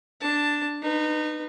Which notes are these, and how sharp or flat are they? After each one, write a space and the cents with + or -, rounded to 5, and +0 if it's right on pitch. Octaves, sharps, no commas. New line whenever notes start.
D4 +0 A5 +10
D#4 -30 B4 +0